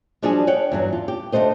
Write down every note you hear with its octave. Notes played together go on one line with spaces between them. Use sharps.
F3 G3 D4 F#4 G#4
C#5 F#5 G5
E2 G2 F#3
F4
G4
D2 G2 A3 C5 D#5